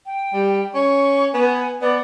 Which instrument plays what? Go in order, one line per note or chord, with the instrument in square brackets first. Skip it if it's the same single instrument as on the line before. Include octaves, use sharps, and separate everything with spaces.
[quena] G5
[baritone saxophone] G3
[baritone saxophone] C#4 [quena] C#6
[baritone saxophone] B3 [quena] G#5
[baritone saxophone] B3 [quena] D5